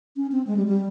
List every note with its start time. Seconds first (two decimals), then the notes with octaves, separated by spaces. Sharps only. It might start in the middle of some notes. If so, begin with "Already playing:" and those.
0.16 C#4
0.32 C4
0.47 G#3
0.57 G3
0.67 G3